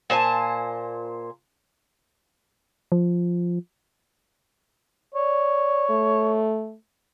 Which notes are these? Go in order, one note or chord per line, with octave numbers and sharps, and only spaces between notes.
A#2 C5 G#5 A5
F3
C#5 D5
A3